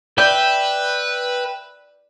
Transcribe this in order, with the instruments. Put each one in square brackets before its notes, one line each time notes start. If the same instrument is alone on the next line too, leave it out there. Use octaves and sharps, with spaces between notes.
[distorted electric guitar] B4 [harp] D5 G6 [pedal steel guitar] E5 G5